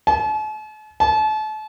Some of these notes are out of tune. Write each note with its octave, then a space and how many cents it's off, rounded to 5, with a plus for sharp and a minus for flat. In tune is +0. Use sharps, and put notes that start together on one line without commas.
A5 -45
A5 -35